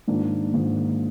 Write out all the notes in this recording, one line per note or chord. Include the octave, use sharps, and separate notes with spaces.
G#2 D#3 A#3 D4 F4
G#2 D#3 A#3 D4 F4